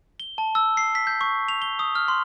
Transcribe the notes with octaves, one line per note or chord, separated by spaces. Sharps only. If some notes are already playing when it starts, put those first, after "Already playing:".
G7
A5
E6
C7
B6
G6
C#6
F7
G7
D#6
F6
C6